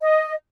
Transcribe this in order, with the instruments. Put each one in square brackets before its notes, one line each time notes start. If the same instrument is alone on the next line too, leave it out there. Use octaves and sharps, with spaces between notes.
[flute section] D#5